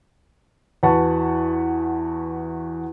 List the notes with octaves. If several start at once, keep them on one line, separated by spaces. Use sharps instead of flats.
E2 F#4 B4 F#5 A5 C#6